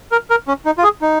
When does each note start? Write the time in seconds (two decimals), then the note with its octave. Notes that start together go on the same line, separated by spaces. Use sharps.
0.12 A#4
0.30 A#4
0.48 C#4
0.66 D#4
0.78 F4
0.83 G#4
1.02 D#4